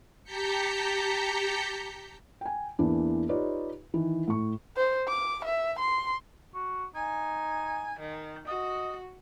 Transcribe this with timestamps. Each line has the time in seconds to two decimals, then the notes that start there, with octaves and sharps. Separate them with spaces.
0.24 G4 A5 A#5 G6 B6 C#7
2.41 G5 G#5
2.79 E2 E3 A#3 D4
3.29 D#4 F4 G4 B4 C#5 D5
3.94 D#3 E3
4.28 A2 C#6
4.77 C5
5.08 D6
5.45 E5
5.80 C6
6.54 F#4
6.95 D#4 G#5
8.00 D#3
8.47 F#4 D#5